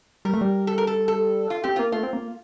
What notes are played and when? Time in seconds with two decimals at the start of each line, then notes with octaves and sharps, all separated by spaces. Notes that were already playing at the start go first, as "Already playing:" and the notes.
0.25 G3 A#4
0.34 A3
0.41 G3
0.67 A4
0.78 A#4
0.87 A4
1.08 A4
1.50 F4
1.64 C4 G4
1.76 A#3 F4
1.92 A3 F4
2.03 C4
2.13 A#3